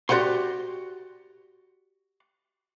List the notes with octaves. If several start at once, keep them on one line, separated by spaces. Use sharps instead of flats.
F#4 G4 C5 D5 F#5 C6